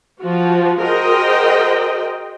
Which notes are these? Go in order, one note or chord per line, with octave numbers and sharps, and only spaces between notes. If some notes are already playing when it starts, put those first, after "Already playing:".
F3 F4 F#4
F#4 G#4 A#4 C5 D#5 G5